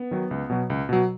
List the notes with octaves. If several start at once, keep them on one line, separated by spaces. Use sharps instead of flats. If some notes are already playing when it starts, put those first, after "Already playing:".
Already playing: B3
D#3 F#3
C#2
B2 F#3
C#2
B2 F#3